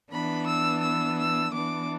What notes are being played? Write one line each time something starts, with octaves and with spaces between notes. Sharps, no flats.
E3 B3 D4 B5
E6
E6
E6
E3 B3 D4 D6